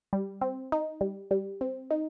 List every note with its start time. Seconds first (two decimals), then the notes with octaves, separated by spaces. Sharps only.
0.13 G3
0.41 C4
0.72 D#4
1.01 G3
1.31 G3
1.61 C4
1.91 D#4